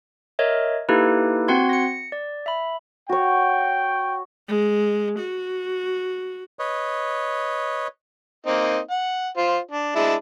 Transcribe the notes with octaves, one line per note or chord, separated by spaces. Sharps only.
A#4 C#5 D#5 E5
A#3 D#4 E4 G4 A4 B4
C4 F#4 F#5 C6 G#6
A#6 C#7
D5
E5 B5
F#4 C#5 G5
G#3
F#4
B4 C#5 D#5
A#3 C4 D#4
F#5
F4 C5
D4
G#3 D4 E4